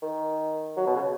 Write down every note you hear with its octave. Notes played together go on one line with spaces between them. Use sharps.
D#3
F#3
B2
C#3